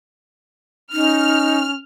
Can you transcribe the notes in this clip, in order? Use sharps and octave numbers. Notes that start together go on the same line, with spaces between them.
C#4 D#4 F6